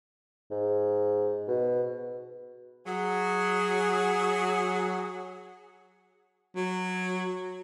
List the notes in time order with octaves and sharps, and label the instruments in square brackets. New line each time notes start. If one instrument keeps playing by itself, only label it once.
[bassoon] G#2
B2
[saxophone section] F#3 G#4
[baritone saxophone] F#3